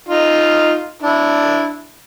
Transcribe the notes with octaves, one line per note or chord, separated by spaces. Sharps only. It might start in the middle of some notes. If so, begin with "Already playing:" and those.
D#4 F4
D4 E4